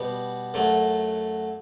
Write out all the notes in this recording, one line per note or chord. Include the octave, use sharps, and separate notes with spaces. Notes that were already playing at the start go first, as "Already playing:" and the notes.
Already playing: B2 G3 B3
F#2 F#3 A3